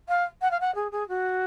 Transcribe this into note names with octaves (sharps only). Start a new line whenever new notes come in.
F5
F#5
F5
F#5
G#4
G#4
F#4